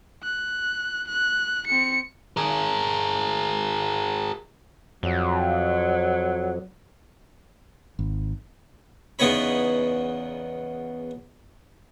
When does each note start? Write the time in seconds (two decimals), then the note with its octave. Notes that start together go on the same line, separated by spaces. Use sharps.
0.23 F#6
1.08 F#6
1.67 C4 C#7
2.37 G#4 A#4
5.03 F2 F#3
7.99 G#1
9.19 E2 C#3 B3 D#4 C#5 B5